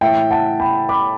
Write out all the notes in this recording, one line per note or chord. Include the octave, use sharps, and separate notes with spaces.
A2 E3 E5 G5
F#5 A5
G5 B5
B5 D6